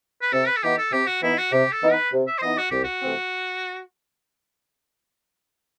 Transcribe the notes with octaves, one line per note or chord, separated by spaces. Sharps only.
B4
C3 A4
B4
A4
E3 B3 D#4 G4
A4
C3 G4
F#4
E3 B3 D#4 E4
F#4
C3 G4
A4
E3 B3 D#4
B4
C3
E5
C5
E3 B3 D#4 D#5
F#4
C2 G4
F#4
C3 E3 A3 C4